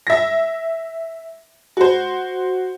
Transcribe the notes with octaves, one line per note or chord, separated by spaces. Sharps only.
E5 A#6
F#4 C5